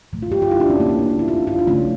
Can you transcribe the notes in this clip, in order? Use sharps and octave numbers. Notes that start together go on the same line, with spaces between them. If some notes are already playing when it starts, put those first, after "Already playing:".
A#2 F3 A3
F4
G4
F4
E4
D4
C#4
A#3
C#4
D4
C#4
E4
F4
F4
D4
C#3 F3 A3 C#4